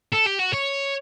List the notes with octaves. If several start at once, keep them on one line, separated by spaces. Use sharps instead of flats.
A4
G4
F#4
C#5